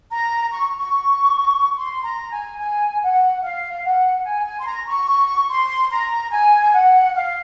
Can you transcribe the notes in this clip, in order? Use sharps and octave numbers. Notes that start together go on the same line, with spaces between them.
A#5
C#6
C#6
C6
A#5
G#5
G#5
F#5
F5
F5
F#5
G#5
G#5
C6
A#5
C#6
C#6
C6
A#5
G#5
F#5
F5